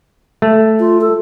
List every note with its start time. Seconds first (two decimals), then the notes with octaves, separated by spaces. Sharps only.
0.42 A3
0.80 F4
1.01 A4